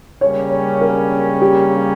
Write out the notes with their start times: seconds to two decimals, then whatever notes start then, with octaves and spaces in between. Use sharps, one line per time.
0.21 C#3 G3 A#3 C#4 C#5
0.81 A#4
1.42 G4